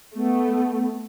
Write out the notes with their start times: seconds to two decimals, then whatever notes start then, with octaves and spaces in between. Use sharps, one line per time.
0.15 A3 B3